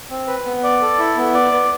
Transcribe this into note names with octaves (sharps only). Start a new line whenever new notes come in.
C4
B4
B3
D5
A4
E4
B3
D5
B3